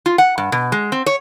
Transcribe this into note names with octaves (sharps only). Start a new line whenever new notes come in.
F4
F#5
G2
B2
G#3
C4
C#5